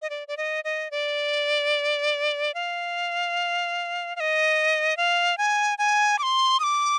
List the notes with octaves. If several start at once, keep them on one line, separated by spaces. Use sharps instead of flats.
D#5
D5
D5
D#5
D#5
D5
F5
F5
D#5
F5
G#5
G#5
D6
C6
D#6
D6